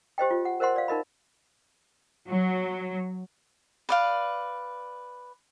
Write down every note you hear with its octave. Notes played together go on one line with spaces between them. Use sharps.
G4 C5 D#5 G5
F4
F#5
A#4 C5 D#5 F#5 C6
D5 F5
D#4 A#4 D#5 B5
F#3
B4 D5 F5